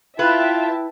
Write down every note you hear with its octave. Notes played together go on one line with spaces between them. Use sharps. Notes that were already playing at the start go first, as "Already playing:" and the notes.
E4 F4 B4 E5 G5 A5